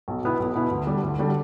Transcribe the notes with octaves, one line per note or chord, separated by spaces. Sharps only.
B1
B2 B3 E4
B1
B2 B3 E4
D2
D3 G3
D2
D3 G3